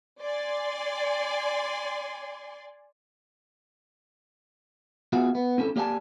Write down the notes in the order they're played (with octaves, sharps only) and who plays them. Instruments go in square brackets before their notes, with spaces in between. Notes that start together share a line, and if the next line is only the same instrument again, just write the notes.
[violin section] D5 G#5 C6
[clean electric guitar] B3 F4 F#4 G#4 E5 F#5
B3
C4 C#4 E4 A4
A#3 G4 D5 E5 G#5 A5